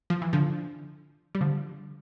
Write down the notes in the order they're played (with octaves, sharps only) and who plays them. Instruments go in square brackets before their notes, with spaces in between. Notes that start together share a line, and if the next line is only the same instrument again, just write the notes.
[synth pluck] F3
E3
D3 F3
G3
D3 F3